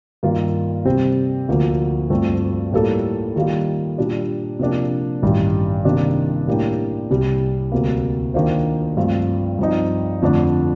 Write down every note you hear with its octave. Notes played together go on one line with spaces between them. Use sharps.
G2 D#3 A#3 F4 A#4
C3 G3 C4
D2 D3 F3 A#3 D4
G2 F3 A3 C4
A2 G3 A#3 F4 A4
D#3 G3 A#3 F4
A#2 G3 D4
C3 F3 A#3 D4 G4
A1 G2 D#3 G3
C3 D#3 A#3 D4
A2 G3 A#3 D4 G4
C2 C3 G3
D2 C3 G3 A#3
D#3 A#3 D4 F4 C5
G2 F3 A3 C4 F4
G2 F3 C4 D#4
F2 D3 A3 D4